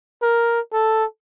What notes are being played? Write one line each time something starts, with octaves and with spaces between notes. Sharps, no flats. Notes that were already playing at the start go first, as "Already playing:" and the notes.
A#4
A4